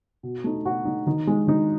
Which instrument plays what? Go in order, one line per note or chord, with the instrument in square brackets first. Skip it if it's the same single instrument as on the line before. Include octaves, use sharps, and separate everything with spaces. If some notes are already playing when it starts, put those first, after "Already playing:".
[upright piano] B2
A3 D#4
B2 F#4
A3 D#4
D#3 D#4
G#3 D#4
D#3 D#4